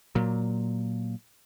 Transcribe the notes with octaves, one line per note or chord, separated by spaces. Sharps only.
A#2 F#3